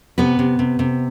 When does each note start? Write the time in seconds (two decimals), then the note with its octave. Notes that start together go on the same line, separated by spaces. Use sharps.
0.18 C3 B3 B4
0.39 C3
0.59 C3
0.79 C3